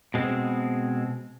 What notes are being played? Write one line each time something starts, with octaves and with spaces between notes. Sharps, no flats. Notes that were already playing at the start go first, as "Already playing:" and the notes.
B2 G#3 C4